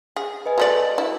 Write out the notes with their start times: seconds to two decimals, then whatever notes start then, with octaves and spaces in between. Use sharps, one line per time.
0.16 G#4
0.46 B4 D#5 G#5
0.58 G#3 A3 F#4 D5
0.98 E4